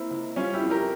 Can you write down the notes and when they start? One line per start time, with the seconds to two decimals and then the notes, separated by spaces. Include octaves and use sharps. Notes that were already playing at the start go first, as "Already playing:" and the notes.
Already playing: A#3 C4 E4
0.11 C#2
0.36 G3 C#4 F4
0.53 E4 G4
0.62 F2
0.71 G4 A#4